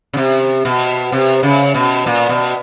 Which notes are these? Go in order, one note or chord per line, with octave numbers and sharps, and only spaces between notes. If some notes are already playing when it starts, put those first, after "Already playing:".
C#3
C3
B2
C3
C#3
B2
A#2
B2